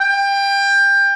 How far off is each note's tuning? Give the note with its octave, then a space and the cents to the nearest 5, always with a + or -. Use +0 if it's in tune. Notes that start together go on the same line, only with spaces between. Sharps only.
G5 +25